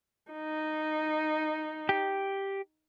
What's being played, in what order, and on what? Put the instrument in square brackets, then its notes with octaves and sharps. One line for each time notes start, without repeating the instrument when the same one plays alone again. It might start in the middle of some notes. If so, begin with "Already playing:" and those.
[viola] D#4
[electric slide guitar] G4